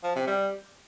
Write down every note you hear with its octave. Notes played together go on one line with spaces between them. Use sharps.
F3
C3
G3